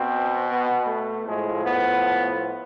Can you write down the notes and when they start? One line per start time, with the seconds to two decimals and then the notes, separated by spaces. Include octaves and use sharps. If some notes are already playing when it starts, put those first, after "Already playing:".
Already playing: B2 C4
0.49 B3
0.86 A3
1.25 A2 F3 G#3
1.63 B3